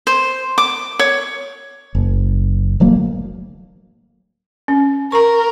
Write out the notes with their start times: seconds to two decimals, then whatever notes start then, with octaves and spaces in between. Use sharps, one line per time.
0.07 C5
0.58 D6
0.99 C#5
1.95 F#1
2.80 D1 D2 F#3 A#3
4.68 C#4
5.12 A#4 A#5 C#6